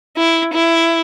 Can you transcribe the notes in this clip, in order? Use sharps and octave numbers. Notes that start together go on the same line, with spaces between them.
E4
E4